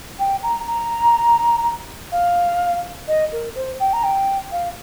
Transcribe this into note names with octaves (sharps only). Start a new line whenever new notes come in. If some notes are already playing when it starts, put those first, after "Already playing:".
G5
A#5
A#5
F5
D#5
A#4
C5
G5
A#5
G5
F5